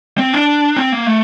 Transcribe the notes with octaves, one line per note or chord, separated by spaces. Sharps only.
C4
D4
C4
A#3
A3